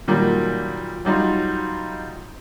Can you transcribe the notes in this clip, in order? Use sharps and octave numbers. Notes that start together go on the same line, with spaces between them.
A#2 D#3 F#3 G3
F#3 G3 D#4 F4